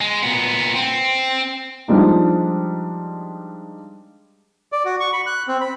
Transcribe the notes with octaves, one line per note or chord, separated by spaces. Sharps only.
G#3
A#2 B3
C4
F3 G3 G#3 D4 D#4
D5
F#4
C#6
B5
F#6
C4
B5